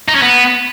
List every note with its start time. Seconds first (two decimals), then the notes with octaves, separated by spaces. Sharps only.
0.09 D#4
0.15 C#4
0.22 B3